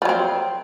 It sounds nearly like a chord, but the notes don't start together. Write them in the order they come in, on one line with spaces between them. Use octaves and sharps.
F3 F#3 C4